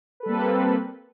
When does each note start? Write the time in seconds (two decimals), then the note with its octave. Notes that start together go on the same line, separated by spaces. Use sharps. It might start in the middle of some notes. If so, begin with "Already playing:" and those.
0.20 B4
0.23 A4
0.26 G3
0.29 A#3
0.32 C4